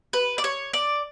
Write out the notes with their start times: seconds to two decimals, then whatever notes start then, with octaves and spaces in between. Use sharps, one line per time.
0.13 B4
0.38 D5
0.44 C#5
0.73 D5